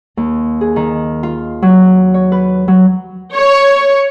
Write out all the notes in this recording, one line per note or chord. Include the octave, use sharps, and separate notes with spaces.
D#2
G#4
D#3
F4
F#3
C#5
B4
F#3
C#5